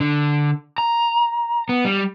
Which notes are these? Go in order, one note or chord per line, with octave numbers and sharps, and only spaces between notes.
D3
A#5
B3
G3